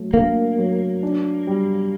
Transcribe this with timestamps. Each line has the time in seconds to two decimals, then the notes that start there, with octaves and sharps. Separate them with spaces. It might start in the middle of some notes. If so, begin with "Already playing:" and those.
Already playing: F#3 A3
0.14 A#3 D4
0.58 F#3
1.03 D4
1.47 G3